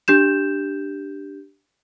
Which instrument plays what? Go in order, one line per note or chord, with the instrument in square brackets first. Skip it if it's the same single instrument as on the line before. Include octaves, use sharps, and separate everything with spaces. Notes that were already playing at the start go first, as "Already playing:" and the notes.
[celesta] D4 G4 G6 E7